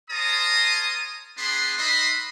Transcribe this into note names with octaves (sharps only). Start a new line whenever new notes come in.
A#4 C#5 A5 A#5 C6 D#6
B3 D4 G#4 B5 C6
D#4 B4 D#5 E5 B5 C6